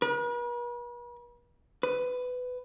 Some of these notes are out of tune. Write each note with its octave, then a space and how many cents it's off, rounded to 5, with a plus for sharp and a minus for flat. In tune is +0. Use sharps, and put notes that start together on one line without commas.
B4 -45
B4 +15